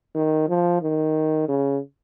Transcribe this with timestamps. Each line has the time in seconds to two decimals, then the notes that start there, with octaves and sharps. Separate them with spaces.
0.15 D#3
0.48 F3
0.82 D#3
1.48 C#3